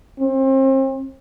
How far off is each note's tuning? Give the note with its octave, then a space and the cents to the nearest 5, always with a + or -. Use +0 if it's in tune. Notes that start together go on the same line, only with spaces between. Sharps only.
C4 +35